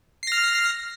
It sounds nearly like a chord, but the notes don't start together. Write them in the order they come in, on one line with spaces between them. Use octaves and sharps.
C7 A#6 F6